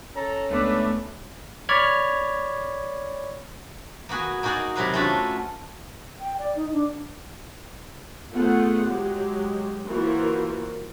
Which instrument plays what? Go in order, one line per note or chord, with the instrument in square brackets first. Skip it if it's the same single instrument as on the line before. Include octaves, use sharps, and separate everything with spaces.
[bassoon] C#4 [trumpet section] A4 A#5
[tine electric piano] C#2 B3 D6 [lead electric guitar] A3 [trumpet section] D4 B4
[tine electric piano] C#5 D5 B5 F6 G#6
[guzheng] A#3 B3 F#4 G#4
A#3 D#4 F#4 G#4 D5 F#5
C3 F#3 A#4 B4 F5
A3 C#4 D4 F4 F#4 A4
[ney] G5
D5
D#4
D4
[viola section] A3 B3 F4 G#4 C5 F#5
F#3 G#3 G4
E3 A#3 F4 F#4 A#4 C5